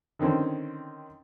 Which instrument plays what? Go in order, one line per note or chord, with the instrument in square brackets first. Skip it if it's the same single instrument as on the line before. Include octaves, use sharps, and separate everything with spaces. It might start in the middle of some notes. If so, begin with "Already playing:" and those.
[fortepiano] D3 D#3 C4 C#4